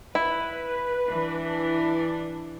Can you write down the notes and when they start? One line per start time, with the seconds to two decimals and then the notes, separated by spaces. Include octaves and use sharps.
0.15 E4 B4
1.08 E3 D4